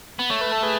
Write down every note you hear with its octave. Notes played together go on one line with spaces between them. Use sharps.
B3
A3 C#5
B4
A4
G#4 B4